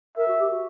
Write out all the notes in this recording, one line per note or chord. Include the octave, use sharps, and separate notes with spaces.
A#4 E5
F#4
G4
F#4